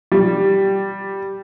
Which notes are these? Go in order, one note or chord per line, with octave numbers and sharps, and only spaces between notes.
G3